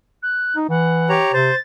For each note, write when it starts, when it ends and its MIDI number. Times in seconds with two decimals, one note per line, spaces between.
0.22 0.56 90
0.56 0.66 63
0.69 1.19 52
0.69 1.13 78
1.09 1.32 67
1.09 1.32 73
1.09 1.32 82
1.33 1.51 48
1.33 1.55 72
1.33 1.59 93